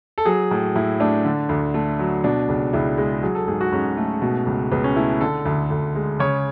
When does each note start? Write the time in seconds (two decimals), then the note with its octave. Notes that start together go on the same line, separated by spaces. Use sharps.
0.18 A4
0.25 F#3 G#4
0.51 A2
0.75 A2 E4
1.00 A3 D4
1.25 D3
1.49 D2
1.74 A3
1.99 F#3
2.24 B2 D4
2.49 C#2
2.73 C#2 E4
2.98 G#3
3.23 F#3 G#4
3.35 A4
3.48 G#2 G#4
3.61 F#4
3.72 G#2 C#4
3.97 A3
4.22 B2
4.47 C#2
4.72 C#2 B3
4.84 C#4
4.96 A3 E4
5.21 D3 A4
5.45 D2
5.70 D2
5.96 G#3
6.19 C#3 C#5